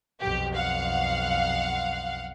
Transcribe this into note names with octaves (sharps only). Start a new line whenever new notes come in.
B1 F2 G4
F5 F#5